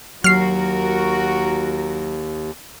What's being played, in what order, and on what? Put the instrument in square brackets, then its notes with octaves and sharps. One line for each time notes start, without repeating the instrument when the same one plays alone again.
[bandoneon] D#2 [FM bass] F#3 [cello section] F#4 A#4 [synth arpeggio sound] F6 C7